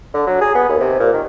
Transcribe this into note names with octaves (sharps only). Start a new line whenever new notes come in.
D3
F#3
G#4
B3
D#2
C3
A#2
D#3